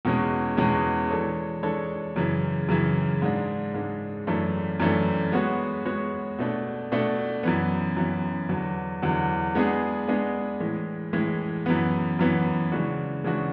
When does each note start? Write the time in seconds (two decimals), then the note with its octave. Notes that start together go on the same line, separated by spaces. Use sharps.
0.05 E2 B2 G#3 C#4
0.57 E2 B2 G#3 C#4
1.10 E3 G#3 D4 A4 C#5
1.63 E3 G#3 D4 A4 C#5
2.16 F#2 C#3 E3
2.69 F#2 C#3 E3
3.22 G#2 G#3 D4
3.74 G#2 G#3 D4
4.27 F#2 E3 A3 D4
4.80 F#2 E3 A3 D4
5.32 G#3 B3 F#4 C#5
5.86 G#3 B3 F#4 C#5
6.38 B2 A3 D4
6.92 B2 A3 D4
7.43 F#2 E3 B3
7.97 F#2 E3 B3
8.49 E2 D3 F#3
9.02 E2 D3 F#3
9.55 G#3 B3 D4 G#4
10.08 G#3 B3 D4 G#4
10.60 A2 E3 G#3
11.13 A2 E3 G#3
11.66 F#2 E3 B3
12.19 F#2 E3 B3
12.72 C#3 E3 G#3 D4 F#4
13.24 C#3 E3 G#3 D4 F#4